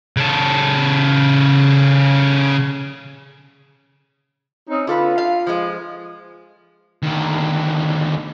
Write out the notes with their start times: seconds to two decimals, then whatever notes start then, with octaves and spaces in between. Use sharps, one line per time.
0.17 C#3 A4
4.69 C4 C#4 D#4
4.87 D3 F4 A4 B4
5.18 F5
5.47 F3 G#3
7.03 D2 D#3